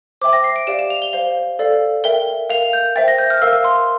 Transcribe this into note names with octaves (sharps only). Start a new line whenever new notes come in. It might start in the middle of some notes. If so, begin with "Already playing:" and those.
C5 E5 G5 D6
A#6
C7
D7
G4 D5 F5 E7
E7
F7
G7
C5 F5
A4 D5 F5
A#4 E5 G5 G7
A#4 F5 F7
G6
C5 E5 G5 A6
A#6
G6
F6
A#4 F5 E6
C6